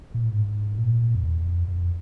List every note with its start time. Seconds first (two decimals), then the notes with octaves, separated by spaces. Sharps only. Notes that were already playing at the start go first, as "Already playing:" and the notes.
0.14 A#2
0.24 A2
0.33 G#2
0.78 A#2
1.15 F2
1.23 E2
1.45 F2
1.68 F2